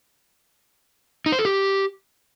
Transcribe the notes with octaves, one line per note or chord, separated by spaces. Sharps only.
D#4
C5
A4
G4